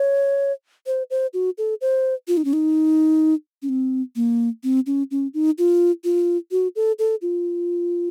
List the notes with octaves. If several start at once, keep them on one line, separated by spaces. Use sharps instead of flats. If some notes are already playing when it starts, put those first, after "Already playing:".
Already playing: C#5
C5
C5
F#4
A4
C5
F4
D#4
C#4
D#4
C#4
C4
A#3
C4
C#4
C#4
D#4
F4
F4
F#4
A4
A4
F4